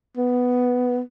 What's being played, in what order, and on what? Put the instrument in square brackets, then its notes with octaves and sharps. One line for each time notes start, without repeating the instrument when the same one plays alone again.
[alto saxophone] B3